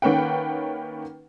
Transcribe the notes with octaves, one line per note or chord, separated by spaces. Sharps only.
D#3 A#3 C#4 B4 F#5 G5